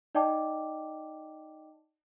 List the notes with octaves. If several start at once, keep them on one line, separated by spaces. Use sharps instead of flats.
D#4 D5 D#5 G5 A5 D6